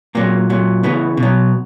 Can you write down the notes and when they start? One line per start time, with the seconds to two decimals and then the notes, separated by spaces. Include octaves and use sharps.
0.15 A#2 F#3 A#3
0.50 A#2 F#3
0.83 C#3 E3 B3
1.17 B2
1.23 F#3